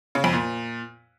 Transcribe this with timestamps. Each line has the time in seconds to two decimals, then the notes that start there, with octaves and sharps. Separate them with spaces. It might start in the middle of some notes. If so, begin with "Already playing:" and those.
0.15 C#3
0.24 F2
0.33 A#2